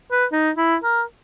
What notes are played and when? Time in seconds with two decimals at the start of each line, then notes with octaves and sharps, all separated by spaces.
0.12 B4
0.32 D#4
0.57 E4
0.84 A#4